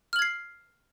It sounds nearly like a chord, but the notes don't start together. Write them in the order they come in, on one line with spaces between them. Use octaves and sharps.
F6 F#7 G#6 C7